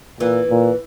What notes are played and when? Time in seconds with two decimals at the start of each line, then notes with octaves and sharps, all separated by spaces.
0.20 A#2 E3
0.50 A#2